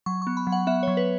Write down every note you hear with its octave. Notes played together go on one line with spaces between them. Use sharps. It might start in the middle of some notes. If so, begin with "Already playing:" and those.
F#3 C#6
B3 C#6
B5
F#3
F#5
B3 E5
F#3 C#5
B4